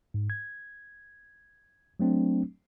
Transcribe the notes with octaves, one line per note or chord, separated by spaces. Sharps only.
G#2
G#6
F#3 A3 C4 D4